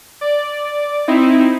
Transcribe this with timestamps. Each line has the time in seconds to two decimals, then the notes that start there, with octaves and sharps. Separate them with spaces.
0.21 D5
1.08 C4 D#4 E4